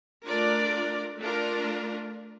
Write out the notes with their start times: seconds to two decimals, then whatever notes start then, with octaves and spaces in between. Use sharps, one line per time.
0.26 A3 D4 F4 A#4 D5
1.19 A3 D4 F4 A#4